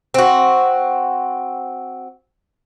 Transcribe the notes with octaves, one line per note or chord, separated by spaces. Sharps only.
C4 F#4